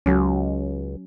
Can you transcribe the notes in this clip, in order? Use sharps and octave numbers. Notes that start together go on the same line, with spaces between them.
C#2 F#3 C#4